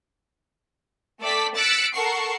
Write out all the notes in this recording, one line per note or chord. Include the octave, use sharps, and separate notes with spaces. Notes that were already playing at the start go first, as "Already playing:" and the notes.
A3 A4 D5 G5 B6
E6 F#6 A6 B6 C#7 D7
A4 A#4 F#5 C#6 C7